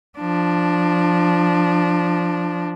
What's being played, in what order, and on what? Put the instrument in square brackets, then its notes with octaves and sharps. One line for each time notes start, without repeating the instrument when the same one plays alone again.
[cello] F3 D4